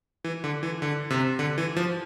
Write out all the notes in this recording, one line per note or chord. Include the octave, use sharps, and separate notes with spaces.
E3
D3
E3
D3
C3
D3
E3
F3